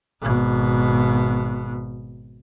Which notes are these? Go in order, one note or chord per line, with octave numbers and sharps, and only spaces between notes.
G#1 B2